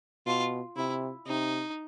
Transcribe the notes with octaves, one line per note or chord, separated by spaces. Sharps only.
B2 F4
C3 E4
C3 D#4